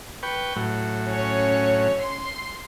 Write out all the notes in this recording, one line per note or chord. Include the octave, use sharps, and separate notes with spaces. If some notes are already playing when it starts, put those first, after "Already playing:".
B4 G5 C#6
A2 F#3
C#4 C#5
C6